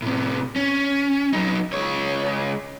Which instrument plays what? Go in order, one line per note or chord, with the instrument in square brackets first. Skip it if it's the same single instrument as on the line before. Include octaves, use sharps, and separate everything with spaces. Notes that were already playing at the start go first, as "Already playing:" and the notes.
[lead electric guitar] A2 C3
C#4
F#3 D#4
C#2 C#5